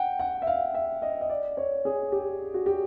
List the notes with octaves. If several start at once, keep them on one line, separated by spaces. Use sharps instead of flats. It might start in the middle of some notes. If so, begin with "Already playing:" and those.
Already playing: F#5 G5
F#5
E5
F5
E5
D#5
D#5
D5
C#5
G#4
G4
F#4
G4